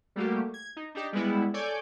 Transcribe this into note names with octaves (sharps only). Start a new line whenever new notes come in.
G3 A3 A#3 F#4 G4
G#6
D#4
D4 D#4 G4
G3 G#3 B3 E4
A4 C#5 D5 G#5 D6 G6